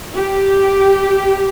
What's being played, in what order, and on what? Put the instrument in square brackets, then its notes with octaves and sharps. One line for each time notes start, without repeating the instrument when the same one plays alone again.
[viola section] G4